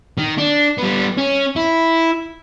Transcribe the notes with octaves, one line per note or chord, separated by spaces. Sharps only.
D#3
D4
G3 B3
C#4
E4